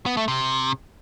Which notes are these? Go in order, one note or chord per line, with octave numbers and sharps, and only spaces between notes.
B3
A3
C3